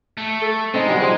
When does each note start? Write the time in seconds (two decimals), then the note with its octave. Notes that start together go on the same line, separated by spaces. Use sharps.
0.18 A3
0.42 A4
0.74 G#3 C4 D#4
0.88 B2 D3 F#3 G3
1.01 F3 C4 D#4 G#4